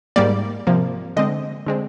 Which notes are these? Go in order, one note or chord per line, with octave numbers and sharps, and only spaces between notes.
G#2 G3 A#3 D5
C3 F3 A#3
D3 G#3 C4 D#5
D3 G#3 C4